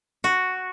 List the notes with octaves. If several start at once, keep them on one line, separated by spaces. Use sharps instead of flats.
F#4